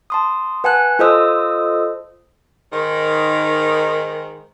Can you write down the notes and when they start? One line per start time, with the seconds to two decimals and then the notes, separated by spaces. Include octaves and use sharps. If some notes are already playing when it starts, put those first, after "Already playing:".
0.10 A5 C6 D#6
0.64 B4 F#5 G#5 A5 F#6
0.99 F4 A4 C5 D#5 D#6 E6
2.73 G#2 D#3